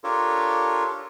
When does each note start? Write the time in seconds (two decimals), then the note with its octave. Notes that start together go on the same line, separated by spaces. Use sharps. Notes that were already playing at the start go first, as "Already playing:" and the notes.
0.04 D4 F4 G4 A4 A#4 C#5